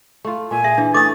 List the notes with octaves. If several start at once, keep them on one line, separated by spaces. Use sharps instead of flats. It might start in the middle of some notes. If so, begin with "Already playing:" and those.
A3 F4
A#2 E5 G#5
G#4 E5
E3 D4
A3 C#4 E4 D6 D#6 A6